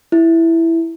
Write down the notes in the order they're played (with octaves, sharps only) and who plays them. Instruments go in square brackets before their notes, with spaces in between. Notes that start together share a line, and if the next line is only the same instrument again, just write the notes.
[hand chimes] E4